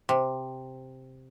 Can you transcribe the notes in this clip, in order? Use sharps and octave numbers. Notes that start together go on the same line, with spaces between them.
C3